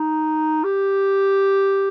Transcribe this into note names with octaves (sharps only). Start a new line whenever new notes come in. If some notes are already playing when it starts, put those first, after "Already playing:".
Already playing: D#4
G4